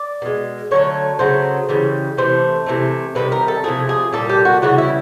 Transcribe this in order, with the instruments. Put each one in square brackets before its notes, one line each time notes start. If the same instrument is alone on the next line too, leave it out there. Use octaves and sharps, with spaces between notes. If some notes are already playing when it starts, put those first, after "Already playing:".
Already playing: [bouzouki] D5
B2 G#3
D3 F#3 A3 C#5
C#3 F#3 A3 C5
C#3 E3 G3
C3 E3 A3 C5
C3 E3 A3
C3 D#3 G3 B4
A#4
A4
C3 F3 A3 G#4
G#4
A#2 G3 A4
G4
F#4
C#3 E3 G3 F#4
E4